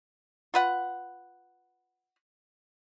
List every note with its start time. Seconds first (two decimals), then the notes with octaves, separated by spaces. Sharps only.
0.54 F4 B4 F#5